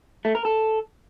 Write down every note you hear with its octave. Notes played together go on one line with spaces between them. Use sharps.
A3
A#4
A4